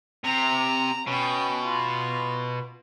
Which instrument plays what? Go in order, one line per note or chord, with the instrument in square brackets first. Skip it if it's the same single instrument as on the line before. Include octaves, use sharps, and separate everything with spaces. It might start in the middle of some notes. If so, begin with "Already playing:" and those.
[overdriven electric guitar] C3 [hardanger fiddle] A#5
[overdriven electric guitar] B2 [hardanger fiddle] C#4 G5
[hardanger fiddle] F4